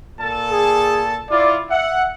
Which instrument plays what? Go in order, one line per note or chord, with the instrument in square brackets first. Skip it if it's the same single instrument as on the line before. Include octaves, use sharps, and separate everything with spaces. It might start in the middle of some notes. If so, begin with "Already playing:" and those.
[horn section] A#2 A4 A5
[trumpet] G#4
[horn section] E4 F4 [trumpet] D5
[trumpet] E5 [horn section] F#5